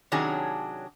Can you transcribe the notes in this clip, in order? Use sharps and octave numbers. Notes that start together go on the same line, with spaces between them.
C3 D#3 F#3 C#4 D4 G#4